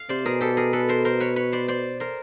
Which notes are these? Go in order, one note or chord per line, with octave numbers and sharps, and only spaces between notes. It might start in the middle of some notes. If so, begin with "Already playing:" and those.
Already playing: F5
C3 C5 D5
B2 G#4 A#4
G4 A4
G#4 A#4
A4 B4
A#4 C5
A#4 C5
B4 C#5
B4 C#5
C5 D5
C5 D5
A#4 C5